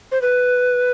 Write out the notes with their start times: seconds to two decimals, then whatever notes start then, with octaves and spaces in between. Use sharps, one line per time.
0.12 C5
0.22 B4